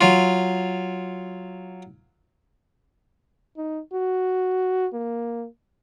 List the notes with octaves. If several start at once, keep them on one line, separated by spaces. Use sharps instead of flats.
F#3 F4
D#4
F#4
A#3